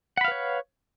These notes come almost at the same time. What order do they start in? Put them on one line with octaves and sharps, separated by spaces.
F#5 B5 F5 B4 C#5